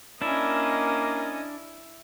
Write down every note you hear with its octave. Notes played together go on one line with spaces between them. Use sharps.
A#3 C#4 D4 E4 D#5